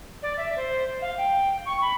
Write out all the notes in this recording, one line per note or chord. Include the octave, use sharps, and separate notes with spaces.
D5
E5
C5
F5
G5
C#6
B5